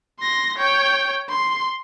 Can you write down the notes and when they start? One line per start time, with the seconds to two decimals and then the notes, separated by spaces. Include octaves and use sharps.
0.19 C6 A#6
0.58 C#5 G5
1.29 C6